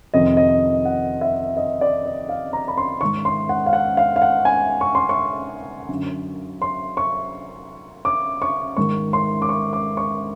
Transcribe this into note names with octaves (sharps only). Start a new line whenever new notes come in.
F2 C3 D#3 D#5
D#5
F#5
E5
D#5
D5
D#5
F5
A#5
B5
C6
G#2 D#3 C#6
C6
F#5
F5
F#5
F5
F5
F#5
G#5
C#6
C6
C#6
F#2 D3
C6
C#6
D6
C#6
G#2 D#3 C#6
C6
D6
C#6
D6
C#6